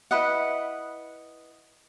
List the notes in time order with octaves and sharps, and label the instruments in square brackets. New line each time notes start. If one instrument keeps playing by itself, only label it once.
[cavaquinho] E4 B4 D#5 F#5